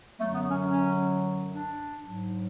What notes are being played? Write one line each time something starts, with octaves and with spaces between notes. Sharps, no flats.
F#2 D3 F#3 A3
B3
C#4
C#4
D4
G#2 F#3